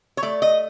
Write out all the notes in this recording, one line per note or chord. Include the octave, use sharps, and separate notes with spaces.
C#5
A3 D5
D#5